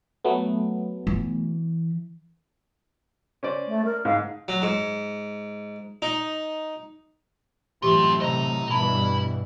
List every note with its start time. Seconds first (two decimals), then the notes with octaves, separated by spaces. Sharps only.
0.25 F#3 A3 B3
1.07 E3
3.43 C#4 C5 D5
3.68 A3
3.85 A#4
4.05 G#2 F5
4.48 F#3
4.62 G#2
6.02 D#4
7.82 F#2 A2 E3 C4 F4 G4 C#6
8.21 C3 C5 D#5 A#5
8.71 G2 B2 E3 E4 A5 B5